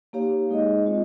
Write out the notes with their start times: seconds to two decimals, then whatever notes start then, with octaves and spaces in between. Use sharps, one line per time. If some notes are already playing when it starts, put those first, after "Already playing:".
0.13 A#3 D#4 G4 C#5 F5
0.49 G#3 D#4 G#4 D#5
0.85 G#3 C4 F4 C5 D#5